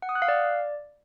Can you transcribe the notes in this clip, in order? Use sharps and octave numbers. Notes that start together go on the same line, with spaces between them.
F#5
D#6
F#6
F5
D5